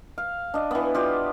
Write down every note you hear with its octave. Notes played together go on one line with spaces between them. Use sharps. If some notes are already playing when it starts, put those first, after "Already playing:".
F5
D4 D#5
E3 B3
F4 G4 D5